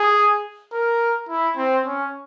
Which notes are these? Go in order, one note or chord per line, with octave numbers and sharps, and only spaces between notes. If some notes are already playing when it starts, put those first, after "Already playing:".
Already playing: G#4
A#4
E4
C4
C#4